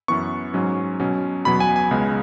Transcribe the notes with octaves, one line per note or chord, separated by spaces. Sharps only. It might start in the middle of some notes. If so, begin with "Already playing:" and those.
F#2 E3 B3 C#6
G#2 F#3 C#4
B2 F#3 C#4
E2 B2 F#3 B3 B5
G#5
G#5
C#2 C#3 G#3 B3